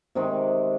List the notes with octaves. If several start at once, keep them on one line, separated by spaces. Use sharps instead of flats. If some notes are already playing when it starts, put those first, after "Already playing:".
C3 D#3 G#3